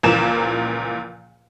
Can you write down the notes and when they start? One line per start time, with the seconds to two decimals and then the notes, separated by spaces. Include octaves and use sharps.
0.03 C#2 A#2 E3 F3 A#4 E7